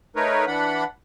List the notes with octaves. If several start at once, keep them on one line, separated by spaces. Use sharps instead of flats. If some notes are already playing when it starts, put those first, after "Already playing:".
A3 D#4 A#4 B4 C#5
E3 D4 F#5 B5